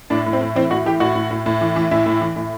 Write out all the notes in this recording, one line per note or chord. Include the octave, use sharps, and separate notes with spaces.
A2 D4
A2
C4
A2
E3 C4
A2 F#4
E3 G4
A2 F#4
A2
A2
A2
E3
E3
A2 E4
A2
E3
A2